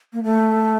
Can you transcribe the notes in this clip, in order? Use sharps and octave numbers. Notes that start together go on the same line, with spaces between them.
A#3
A3